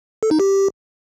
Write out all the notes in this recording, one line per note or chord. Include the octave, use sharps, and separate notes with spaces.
A4
D#4
G4